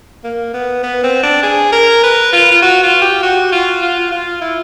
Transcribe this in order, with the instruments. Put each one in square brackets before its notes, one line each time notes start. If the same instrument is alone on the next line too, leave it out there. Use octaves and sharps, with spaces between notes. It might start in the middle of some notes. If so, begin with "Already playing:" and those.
[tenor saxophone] A#3
B3
B3
C4
D4
G#4
A#4
B4
F4
F4
F#4
F4
G4
F#4
F4
F4
F4
E4